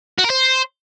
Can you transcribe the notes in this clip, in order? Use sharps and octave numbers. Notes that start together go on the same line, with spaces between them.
F#4
A#4
C5